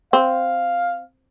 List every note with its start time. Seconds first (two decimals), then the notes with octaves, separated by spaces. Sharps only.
0.13 C4 F5